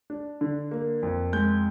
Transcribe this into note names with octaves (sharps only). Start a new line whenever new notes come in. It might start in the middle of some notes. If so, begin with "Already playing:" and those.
D4
D3
A#3
F2
G#3 G6